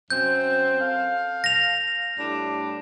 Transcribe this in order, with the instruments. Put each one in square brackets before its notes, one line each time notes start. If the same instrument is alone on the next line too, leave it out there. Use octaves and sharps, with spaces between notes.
[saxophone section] F#2 C4 [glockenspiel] G6
[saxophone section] A4 F5
[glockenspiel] A#6 F7
[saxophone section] A2 G3 D4